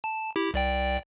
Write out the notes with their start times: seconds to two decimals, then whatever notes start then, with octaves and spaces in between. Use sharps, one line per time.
0.04 A5
0.36 E4 G4
0.54 C2 D5 G5